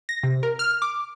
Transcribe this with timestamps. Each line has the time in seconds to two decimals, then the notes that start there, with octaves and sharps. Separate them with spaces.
0.09 A#6
0.23 C3
0.43 A#4
0.59 F6
0.82 D6